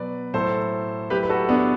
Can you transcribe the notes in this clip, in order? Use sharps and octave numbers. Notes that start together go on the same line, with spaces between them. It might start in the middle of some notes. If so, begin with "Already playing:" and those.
Already playing: B2 F#3 B4 D5
A2 F#3 A4 C5
A2 F#3 G4 B4
B4
F#4 A4
B3 D4